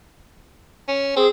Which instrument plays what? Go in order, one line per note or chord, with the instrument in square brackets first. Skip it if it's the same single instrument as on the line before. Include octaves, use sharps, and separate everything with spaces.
[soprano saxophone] C#4
[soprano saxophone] C4 [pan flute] G#4